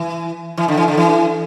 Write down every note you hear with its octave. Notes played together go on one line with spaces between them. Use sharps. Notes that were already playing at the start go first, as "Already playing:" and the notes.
Already playing: E3
E3
D3
E3
D3
E3